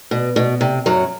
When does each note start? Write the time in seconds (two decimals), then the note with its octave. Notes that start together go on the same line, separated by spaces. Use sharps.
0.11 B2
0.36 B2
0.61 C3
0.86 F#2 F#3